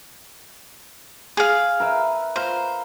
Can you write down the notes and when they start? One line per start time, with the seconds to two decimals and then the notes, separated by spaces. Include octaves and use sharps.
1.37 G#4 F5
1.80 A#4 B4 E5
2.36 B4 C5 F5 A#5